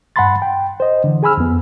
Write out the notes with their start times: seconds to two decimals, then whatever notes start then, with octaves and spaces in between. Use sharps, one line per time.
0.16 G2 F#5 A5 B5 C6 A6
0.42 G5
0.80 C5 D#5
1.04 D3 E3
1.23 G#4 G#5 B5 E6 F6
1.37 F2 B3